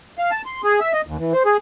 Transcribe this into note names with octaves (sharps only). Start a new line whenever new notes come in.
F5
A5
C6
G#4
E5
D#5
D#2
E3
C5
G#4